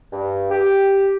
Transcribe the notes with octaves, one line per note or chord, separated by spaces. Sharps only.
G2
G4